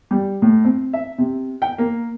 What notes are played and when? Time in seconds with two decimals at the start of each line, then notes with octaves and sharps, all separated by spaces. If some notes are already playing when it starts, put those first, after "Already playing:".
0.11 G3
0.42 A2
0.65 C4
0.93 E5
1.18 C3
1.62 G5
1.78 A#3